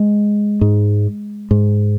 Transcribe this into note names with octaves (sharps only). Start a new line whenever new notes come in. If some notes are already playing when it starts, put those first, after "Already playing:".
Already playing: G#3
G#2
G#2